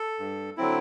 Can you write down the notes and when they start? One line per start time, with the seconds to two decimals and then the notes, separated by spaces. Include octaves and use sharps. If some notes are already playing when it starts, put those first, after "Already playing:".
Already playing: A4
0.19 G2
0.57 D3 F#3 C4 E4